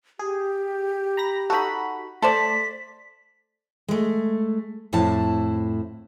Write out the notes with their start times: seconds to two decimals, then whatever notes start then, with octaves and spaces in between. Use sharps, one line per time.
0.19 G4 G#4
1.17 A#5 B5 A#6
1.50 D#4 F#4 A4 B5
2.22 A3 A4 C5 D5 B6
3.88 G#3 A3
4.93 F2 A2 E4 C5 A5